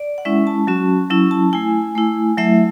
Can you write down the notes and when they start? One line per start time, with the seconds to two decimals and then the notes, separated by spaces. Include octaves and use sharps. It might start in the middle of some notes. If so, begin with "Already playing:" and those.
Already playing: D5
0.18 F#5
0.25 G#3 C#4 E4 E5
0.47 A5
0.67 F#3 C#4 F#4
1.10 F#3 C#4 E4
1.31 A5
1.53 A3 E4 G#5
1.95 A3 E4
2.37 F#3 A3 E4 E5